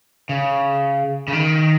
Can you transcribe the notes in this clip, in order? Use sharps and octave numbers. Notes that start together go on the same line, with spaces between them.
C#3
C#3
D#3